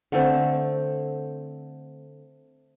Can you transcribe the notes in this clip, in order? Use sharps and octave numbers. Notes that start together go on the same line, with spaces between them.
D3 A3 C4